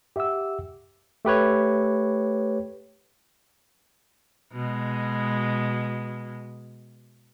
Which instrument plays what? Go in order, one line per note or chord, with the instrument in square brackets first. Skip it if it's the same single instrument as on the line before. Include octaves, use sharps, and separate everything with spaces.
[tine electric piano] G4 E5 F#5 D6 E6
A3 G4 B4 C#5
[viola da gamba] B2 G#3